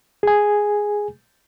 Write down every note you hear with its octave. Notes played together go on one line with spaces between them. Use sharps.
G#4 G#5